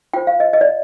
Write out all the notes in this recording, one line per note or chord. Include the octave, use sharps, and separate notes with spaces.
F4 C5 G5
F5
D#5
D#5
D5